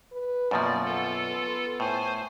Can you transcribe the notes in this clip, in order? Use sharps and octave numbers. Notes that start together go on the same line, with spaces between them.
B4
F#2 B2 F3 A#3 D5
B3 F4 A4
A2 C5 G#5